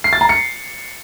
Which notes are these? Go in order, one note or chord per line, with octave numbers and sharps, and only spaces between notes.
C7
A6
A#5
C#7